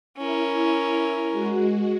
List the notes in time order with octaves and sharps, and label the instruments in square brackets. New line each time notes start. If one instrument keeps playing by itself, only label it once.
[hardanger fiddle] C#4 A#4 [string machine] E4
[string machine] G#3 F#4